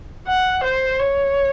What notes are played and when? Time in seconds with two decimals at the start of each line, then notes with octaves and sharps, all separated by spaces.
0.28 F#5
0.64 C5
0.99 C#5